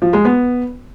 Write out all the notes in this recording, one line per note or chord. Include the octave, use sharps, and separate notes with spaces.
F3
G#3
B3